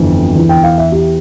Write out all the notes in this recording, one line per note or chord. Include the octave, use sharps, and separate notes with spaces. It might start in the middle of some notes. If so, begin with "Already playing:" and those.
Already playing: G1 F2 E3
E2 E3
G5
F5
E5
G4